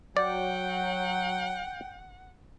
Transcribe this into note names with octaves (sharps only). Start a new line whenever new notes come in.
F#3 D5 F#5 G5